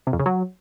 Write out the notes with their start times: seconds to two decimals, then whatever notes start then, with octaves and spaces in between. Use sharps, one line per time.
0.07 C3
0.13 F2
0.19 C#3
0.26 F#3